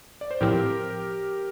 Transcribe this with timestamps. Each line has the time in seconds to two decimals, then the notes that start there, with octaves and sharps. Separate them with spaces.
0.21 D5
0.31 C5
0.41 A2 F3 C4 G4 A#4